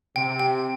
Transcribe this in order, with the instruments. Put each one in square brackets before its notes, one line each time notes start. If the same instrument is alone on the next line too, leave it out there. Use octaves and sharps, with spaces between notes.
[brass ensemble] C3 [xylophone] G5
[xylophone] G5